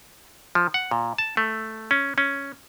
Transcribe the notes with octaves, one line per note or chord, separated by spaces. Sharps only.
F3
F#5
A#2
A5
A3
C#4
C#4